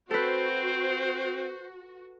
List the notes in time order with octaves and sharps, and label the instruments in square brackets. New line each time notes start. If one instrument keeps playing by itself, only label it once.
[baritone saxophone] C4 [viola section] F#4 [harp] A4 B4 [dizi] C5